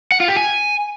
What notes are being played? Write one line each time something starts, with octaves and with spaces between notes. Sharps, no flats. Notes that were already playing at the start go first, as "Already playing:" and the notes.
F#5
F4
G4
G#5